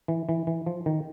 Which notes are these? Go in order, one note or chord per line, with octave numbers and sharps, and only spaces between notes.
E3
E3
E3
F3
D#3